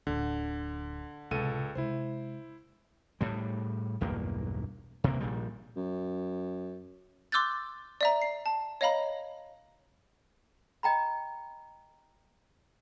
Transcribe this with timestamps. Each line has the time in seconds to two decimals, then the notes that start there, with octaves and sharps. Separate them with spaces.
0.07 D1 D3
1.31 C#2 A2 C3 A4 D#7
1.75 C3 G#3 E4 C5
3.21 A2 G3
4.01 B1 E2 G2 A#3
5.04 C3 A#3
5.20 A#1 A#2 G3
5.76 F#2
7.32 C6 D6 E6 F#6 G6 A6
8.01 D5 E5 A#5
8.22 C7
8.46 A5
8.81 C#5 D#5 F5 A#5 B5
10.83 D#5 G5 A#5 B5